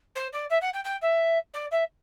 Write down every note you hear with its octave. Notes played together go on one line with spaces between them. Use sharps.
C5
D5
E5
F#5
G5
G5
E5
D5
E5